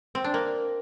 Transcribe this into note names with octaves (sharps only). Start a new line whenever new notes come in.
C4
D4
A#3